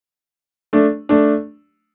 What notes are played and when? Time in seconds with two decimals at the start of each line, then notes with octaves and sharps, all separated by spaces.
0.73 A3 D4
1.09 A3 D4